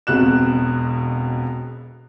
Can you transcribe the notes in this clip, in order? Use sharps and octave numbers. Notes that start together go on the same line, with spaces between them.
E1 F2 B2 F#6 E7